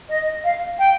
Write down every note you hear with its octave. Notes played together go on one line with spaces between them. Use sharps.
D#5
F5
G5